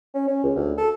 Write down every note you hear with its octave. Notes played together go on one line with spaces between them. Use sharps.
C#4
C#4
C#2
D2
A4